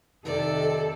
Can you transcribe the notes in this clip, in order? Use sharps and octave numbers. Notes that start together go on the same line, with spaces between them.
F2 C3 D#3 A4 D5